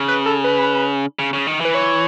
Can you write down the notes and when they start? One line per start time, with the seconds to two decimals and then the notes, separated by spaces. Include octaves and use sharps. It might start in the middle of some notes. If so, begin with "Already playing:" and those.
Already playing: C#3
0.08 B4
0.26 A4
0.44 B4
1.19 C#3
1.33 C#3
1.47 D#3
1.60 E3 B4
1.75 C#5